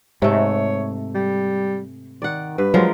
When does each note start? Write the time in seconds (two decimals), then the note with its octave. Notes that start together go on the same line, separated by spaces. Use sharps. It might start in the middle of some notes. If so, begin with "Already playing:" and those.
0.22 G#2 C3 A3 C#5
1.15 G3
2.22 D#3 D5 F#5
2.58 G2 B4
2.74 F3 F#3 G#3 A#4